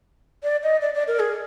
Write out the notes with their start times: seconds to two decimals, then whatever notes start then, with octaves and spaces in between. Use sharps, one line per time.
0.43 D5
0.63 D#5
0.81 D5
0.94 D5
1.08 A#4
1.20 G#4